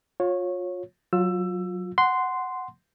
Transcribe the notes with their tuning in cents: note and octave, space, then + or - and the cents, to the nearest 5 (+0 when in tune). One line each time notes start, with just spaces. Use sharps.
F4 +30 C#5 -15
F#3 -5 F4 +25 E6 +15
F#5 +0 C6 -10